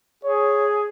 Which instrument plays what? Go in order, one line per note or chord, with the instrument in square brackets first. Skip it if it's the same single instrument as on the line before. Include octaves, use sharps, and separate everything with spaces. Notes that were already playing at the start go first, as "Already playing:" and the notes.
[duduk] G#4 [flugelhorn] C#5